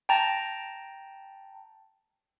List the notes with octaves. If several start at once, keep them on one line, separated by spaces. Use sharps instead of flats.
G5 A5 A#5 A6